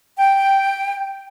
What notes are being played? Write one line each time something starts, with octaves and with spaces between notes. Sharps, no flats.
G5